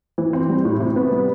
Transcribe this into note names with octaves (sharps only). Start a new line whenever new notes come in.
E3
C4
G3
A2
C3
B3
G3